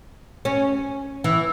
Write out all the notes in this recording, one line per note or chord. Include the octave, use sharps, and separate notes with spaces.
C#4
E3